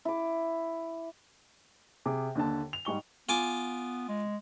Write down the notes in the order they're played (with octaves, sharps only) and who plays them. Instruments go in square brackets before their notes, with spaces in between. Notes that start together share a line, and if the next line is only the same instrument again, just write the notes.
[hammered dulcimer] E4 D6
[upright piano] C3 G#4 D6
D#2 D3 A5
F7
G#2 G3 C#6 G7
[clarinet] B3 [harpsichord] F4 G#5 D6
[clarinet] G#3